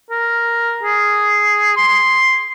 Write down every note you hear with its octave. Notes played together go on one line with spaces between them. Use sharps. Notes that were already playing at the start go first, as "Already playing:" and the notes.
A#4
G#4
C6